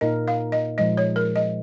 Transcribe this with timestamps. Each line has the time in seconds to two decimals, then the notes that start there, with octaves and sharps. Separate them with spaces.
0.01 A#2 A#3 D#4 A#4 D#5
0.28 F5
0.52 D#5
0.78 A#2 F3 G#3 D#5
0.97 C#5
1.16 A#4
1.36 D#5